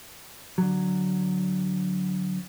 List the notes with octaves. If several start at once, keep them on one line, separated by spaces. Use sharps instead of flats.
D3 F#3